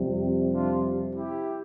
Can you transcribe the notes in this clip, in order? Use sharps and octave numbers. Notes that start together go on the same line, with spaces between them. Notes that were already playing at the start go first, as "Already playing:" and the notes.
Already playing: F2 C3 G3
D4 F4
E4 G4